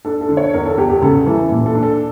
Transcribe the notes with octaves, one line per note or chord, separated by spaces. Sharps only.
D4 A4
A4
D3
C#5
E2 A#4
A4
E2 G4
G4
C#3 A4
E3
A#2
A4
D4
A4